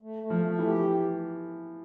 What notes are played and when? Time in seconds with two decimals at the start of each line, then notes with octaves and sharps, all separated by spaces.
0.02 A3
0.23 A3
0.30 F3
0.45 A3
0.59 E3
0.66 G4